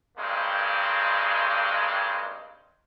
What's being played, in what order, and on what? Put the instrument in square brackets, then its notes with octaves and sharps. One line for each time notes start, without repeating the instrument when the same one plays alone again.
[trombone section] G2 D#3 G#3 A#3 C4